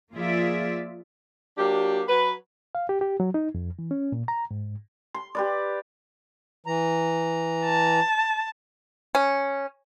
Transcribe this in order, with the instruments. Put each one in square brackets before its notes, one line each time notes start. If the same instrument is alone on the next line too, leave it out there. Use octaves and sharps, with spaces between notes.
[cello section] F3 A#3 F4 G#4 D5 E5
[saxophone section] F#3 A#3 D4 G4
F#3 B4
[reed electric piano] F5
G4
G4
F#3
D#4
F2
E3
C#4
A#2
A#5
G#2
[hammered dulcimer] C6
G4 B4 D5
[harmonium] E3 A#5
[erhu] A5
[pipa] C#4